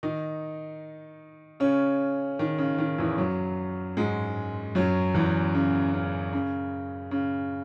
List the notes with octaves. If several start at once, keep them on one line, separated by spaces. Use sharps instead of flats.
D#3 D#4
C#3 C#4
D#3
C#3
D#3
E2 E3
F#2 F#3
G#2 G#3
F#2 F#3
E2 E3
C#3
C#3
C#3
C#3